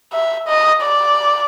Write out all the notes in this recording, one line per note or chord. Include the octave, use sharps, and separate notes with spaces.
E5
D#5
D5